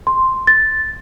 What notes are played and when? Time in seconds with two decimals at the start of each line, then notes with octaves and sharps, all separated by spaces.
0.07 C6
0.47 A6